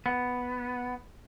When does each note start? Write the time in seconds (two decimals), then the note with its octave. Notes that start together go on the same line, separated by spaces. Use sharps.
0.06 B3